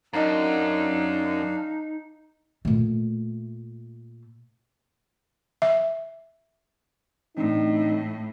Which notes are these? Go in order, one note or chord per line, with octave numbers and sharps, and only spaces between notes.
F#2 D4 D#4 D#5 F5 A#5
A#2 A3
E5
A2 E3 C4 D4 D#4